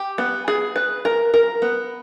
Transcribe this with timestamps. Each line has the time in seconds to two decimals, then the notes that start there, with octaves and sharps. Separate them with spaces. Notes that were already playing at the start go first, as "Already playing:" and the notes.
Already playing: G4
0.18 B3
0.48 G#4
0.76 B4
1.05 A#4
1.34 A#4
1.62 B3